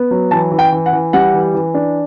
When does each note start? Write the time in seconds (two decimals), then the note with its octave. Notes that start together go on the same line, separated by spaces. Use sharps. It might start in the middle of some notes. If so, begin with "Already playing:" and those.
Already playing: B3
0.11 F#3
0.31 E3 A5
0.52 E3
0.59 G5
0.72 E3
0.86 F#5
0.93 E3
1.13 G3 F#5
1.34 E3
1.54 E3
1.74 D4